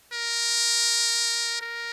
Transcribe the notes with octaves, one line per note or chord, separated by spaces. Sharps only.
A#4
A#4